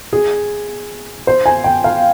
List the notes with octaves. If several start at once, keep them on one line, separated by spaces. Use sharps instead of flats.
G#4
C5
G#5
G5
F5